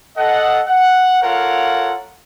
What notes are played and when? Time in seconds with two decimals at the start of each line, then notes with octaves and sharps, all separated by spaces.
0.17 A4 D#5 F#5
0.66 F#5
1.23 F4 A4 A#4 C#5 F5 F#5